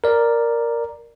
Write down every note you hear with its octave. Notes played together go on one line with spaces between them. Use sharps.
A#4 D5